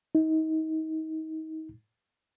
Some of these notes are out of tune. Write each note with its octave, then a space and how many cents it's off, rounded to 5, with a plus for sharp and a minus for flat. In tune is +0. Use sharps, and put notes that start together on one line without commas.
D#4 +30